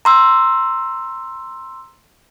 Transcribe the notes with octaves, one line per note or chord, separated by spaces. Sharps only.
A#5 C6 E6